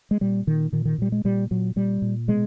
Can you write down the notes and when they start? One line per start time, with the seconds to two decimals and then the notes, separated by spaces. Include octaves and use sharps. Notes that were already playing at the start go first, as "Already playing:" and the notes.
0.11 G#3
0.21 A#2 G3
0.47 A#2 D#3
0.72 A#2 D#3
0.85 D#3
0.98 A#2 G3
1.12 G#3
1.24 A#2 G3
1.51 A#2 F#3
1.76 A#2 G3
2.02 A#2
2.28 B2 G#3